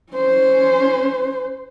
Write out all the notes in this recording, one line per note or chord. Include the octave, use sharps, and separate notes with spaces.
C#4 C5